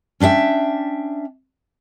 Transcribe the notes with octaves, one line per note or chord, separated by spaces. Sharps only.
C#4 D4 D#5 E5 G5